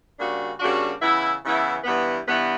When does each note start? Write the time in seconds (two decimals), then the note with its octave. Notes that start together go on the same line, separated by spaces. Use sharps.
0.18 C#3 G3 A#3 D4 F#4
0.59 C#3 G3 A#3 D4 F#4
1.01 C#3 E3 B3 E4
1.43 C#3 E3 B3 E4
1.84 G2 E3 B3
2.26 G2 E3 B3